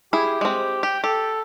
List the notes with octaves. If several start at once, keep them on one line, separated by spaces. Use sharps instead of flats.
E4 G4 G#4
G#3 C4
G4 G5
G4 A4